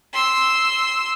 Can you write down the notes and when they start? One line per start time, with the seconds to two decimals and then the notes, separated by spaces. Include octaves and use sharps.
0.14 C6 E6